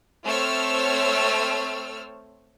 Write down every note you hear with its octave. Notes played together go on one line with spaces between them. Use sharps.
A3 C4 C5 C#5 E6 F6